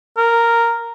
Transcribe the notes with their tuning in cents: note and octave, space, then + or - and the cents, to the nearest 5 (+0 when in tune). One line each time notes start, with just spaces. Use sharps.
A#4 -5